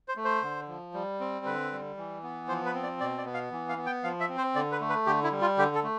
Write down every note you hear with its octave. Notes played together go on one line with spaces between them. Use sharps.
C5
A3
C5
D3
F3
G3
C4
D3 B4
G3
E3
B3
F3 C5
B4
C4
D5
B2 D5
D5
B3
F5
E3
F5
B3
G5
F3 F5
E5
C4
C5
D3 D5
B4
A3
B4
D3 G4
E4
G3
F4
D3 G4
A4
A3